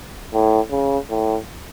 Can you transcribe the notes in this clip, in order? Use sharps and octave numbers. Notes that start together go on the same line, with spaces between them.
A2
C#3
A2